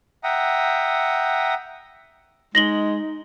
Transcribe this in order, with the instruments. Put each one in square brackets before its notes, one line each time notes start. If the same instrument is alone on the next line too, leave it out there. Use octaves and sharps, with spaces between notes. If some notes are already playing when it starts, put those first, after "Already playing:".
[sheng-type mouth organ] E5 F#5 G5 A#5 D#6
[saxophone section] G#3 [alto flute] D#4 [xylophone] A#6 F#7 G7